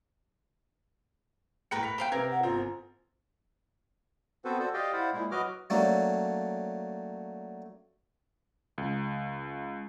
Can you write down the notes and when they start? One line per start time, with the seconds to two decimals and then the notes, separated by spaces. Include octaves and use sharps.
1.71 A2 A#4 B4 G5 B5 C#7
1.83 B6 F7
1.98 C5 F5 G5 F7
2.12 C3 A#4 B4 G#6
2.31 F#5
2.43 G1 C4 F4 A#5
4.45 B3 C4 F#4 A4 B4 C5
4.59 F#4 A4 C5 D5
4.74 G4 D5 D#5 F5 G5
4.93 E4 C5 D5 F5 F#5
5.13 A#2 G#3 E4
5.31 F#3 F#4 B4 D#5 D6 F6
5.70 F#3 A3 A#3 C#4 D4
8.78 C#2